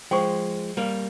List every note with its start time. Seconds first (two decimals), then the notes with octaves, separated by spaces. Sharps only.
0.11 F3 G#3 C5 G5 C#6
0.77 G3 A#3